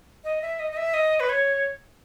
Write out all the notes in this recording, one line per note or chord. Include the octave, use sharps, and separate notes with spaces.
D#5
E5
D#5
D#5
E5
D#5
B4
C#5